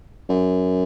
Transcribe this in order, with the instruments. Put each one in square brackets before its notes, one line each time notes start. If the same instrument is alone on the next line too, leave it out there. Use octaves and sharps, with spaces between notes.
[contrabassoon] F#2